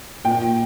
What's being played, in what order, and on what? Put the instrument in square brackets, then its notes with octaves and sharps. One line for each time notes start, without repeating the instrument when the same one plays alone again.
[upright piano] A#2 G5